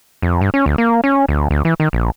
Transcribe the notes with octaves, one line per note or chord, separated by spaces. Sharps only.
F2
G2
C#4
D2
A#3
C#4
D2
D2
E3
D#3
A#1